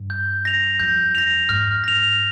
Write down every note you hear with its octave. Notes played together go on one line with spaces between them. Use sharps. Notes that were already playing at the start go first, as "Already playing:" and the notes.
Already playing: G2
G6
A#6 F7
F2 G6
A#6 F7
G#2 F6
A#6 F7